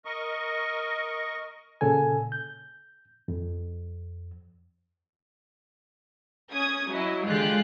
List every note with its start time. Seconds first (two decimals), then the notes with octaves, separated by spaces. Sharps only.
0.05 A#4 D#5 C#6
1.81 A#2 C#3 A4 G#5
2.32 G6
3.28 F2
6.53 C#4 D#6 G#6
6.90 F#3 E4 D#5
7.26 D3 G#3 F4 G4 F#6